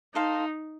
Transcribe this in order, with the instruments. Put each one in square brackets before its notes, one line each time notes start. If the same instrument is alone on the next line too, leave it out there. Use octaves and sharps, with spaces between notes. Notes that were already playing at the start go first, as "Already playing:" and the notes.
[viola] D#4 [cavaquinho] A4 C5 F5 A#5